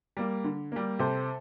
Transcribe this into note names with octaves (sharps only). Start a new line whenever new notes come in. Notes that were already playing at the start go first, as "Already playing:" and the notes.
G3 A#3
D3
G3 A#3
C3 A4 C5